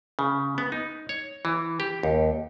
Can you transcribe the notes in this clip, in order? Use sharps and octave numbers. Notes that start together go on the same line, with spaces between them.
C#3
B3
D#4
C#5
E3
G4
D#2